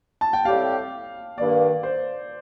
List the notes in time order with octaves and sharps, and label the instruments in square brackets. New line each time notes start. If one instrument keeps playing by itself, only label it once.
[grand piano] A5
G5
[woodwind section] A2 G3 C4 G4 [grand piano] F5
[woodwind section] G2 D#3 A#3 [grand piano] D5
[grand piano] C5